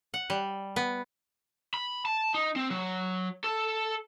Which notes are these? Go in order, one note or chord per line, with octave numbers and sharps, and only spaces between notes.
F#5
G3
B3
B5
A5
D#4
C4
F#3
A4